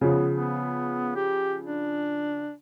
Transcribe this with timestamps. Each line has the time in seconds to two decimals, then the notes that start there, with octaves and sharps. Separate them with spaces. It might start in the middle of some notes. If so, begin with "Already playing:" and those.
0.01 C#3 F3 B3
0.34 B3
1.15 G4
1.65 D4